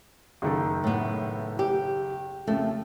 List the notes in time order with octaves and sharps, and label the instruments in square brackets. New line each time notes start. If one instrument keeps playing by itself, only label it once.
[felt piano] F#1 D#3 A4
[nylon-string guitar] A2 B3
G4
[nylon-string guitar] F2 A3 [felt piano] C#3